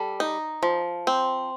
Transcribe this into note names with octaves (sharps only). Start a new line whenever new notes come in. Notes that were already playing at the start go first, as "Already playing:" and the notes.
Already playing: G3 A4
D#4
F3
C4